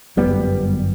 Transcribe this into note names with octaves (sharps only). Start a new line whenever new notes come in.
G1 F#2 G3 B3